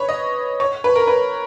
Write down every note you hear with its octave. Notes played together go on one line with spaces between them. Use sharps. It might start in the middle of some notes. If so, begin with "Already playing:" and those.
Already playing: B4 C#5
D#5
C#5
B4
A#4
B4